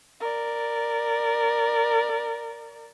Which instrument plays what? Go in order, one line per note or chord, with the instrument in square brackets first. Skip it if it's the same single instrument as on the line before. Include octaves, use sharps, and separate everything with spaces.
[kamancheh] A#4 D5